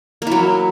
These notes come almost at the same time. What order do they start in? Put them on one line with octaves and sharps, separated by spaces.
A#3 E4 F#3